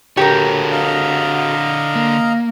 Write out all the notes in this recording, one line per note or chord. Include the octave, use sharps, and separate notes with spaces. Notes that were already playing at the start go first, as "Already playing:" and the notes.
D3 F#4 G4 A4 A#4 C#5
D#5 F5 A#5
A#3